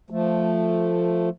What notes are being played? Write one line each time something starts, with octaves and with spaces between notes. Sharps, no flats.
F3 A3